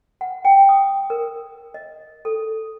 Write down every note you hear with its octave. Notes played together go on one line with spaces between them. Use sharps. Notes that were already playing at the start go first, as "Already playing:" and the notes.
F#5
G5
D#6
A#4
D#5
A4